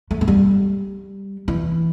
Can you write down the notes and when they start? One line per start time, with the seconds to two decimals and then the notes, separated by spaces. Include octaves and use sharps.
0.11 A3
0.21 A3
0.28 G3
1.48 E3